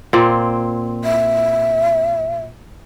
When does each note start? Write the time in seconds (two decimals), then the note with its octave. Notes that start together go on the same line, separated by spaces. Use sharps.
0.13 A#2 C4
1.04 E5